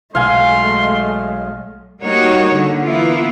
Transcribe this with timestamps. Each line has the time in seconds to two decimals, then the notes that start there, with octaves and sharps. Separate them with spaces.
0.15 B1 G#3 A3 F5 G#5 C6
2.02 G3 A#3 D#4 F#4 C#5
2.52 D3
2.81 E3 A#3 B3 E4 F4